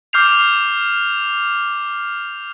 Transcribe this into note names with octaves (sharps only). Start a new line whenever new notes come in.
D6 F6 G6 C7 F7